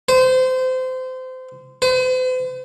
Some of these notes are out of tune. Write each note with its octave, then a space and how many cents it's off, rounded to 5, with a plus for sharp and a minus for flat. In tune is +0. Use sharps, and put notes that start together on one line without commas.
C5 -25
C5 -45